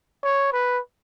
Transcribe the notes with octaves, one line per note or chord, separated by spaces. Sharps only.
C#5
B4